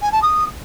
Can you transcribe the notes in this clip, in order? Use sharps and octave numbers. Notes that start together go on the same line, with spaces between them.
G#5
A5
D#6